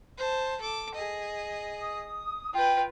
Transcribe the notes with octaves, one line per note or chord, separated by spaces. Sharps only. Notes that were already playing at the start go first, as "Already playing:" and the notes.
C5 A5
A4 D6
G#4 D#5
D#6
F4 B4 G5